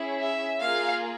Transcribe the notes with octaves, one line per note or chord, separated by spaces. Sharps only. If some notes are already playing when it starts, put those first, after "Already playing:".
Already playing: C#4 E4 G#4
E5
A#3 F4 G#4 F5